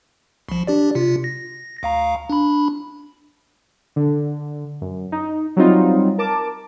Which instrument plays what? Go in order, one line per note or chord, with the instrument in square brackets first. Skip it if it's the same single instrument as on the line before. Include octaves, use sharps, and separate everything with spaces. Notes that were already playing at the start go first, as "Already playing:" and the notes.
[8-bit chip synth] C2 F3
D4 G4 D5
C3 F4
A#6
D2 F5 A#5
D4 B5
[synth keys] D3
F#2
D#4
F#3 G3 C4 D#4 F4
A#4 A5 D6